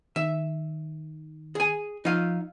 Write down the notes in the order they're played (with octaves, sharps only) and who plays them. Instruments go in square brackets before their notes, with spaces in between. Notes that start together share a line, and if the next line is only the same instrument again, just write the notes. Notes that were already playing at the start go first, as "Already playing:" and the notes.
[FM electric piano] D#3 [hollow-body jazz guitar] E5
[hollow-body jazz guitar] G#4 G#5
[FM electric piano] F3 [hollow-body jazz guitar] D#4 F5